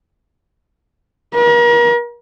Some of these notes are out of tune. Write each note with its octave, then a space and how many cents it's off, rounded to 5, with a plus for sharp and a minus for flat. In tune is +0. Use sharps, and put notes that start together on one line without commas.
A#4 +40